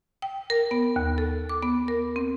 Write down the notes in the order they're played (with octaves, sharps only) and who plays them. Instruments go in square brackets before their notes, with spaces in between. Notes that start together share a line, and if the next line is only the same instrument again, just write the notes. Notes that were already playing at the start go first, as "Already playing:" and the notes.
[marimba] G5
A#4
B3
D#2
A4
D6
B3
A#4
C4